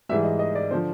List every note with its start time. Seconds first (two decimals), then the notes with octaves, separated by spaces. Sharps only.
0.09 G#2 E3 G3 E5
0.24 D#5
0.39 D#5
0.55 D5
0.71 D3 F3 C5